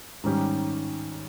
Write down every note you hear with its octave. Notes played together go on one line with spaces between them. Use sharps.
G#2 D#3 G3 C#4 G4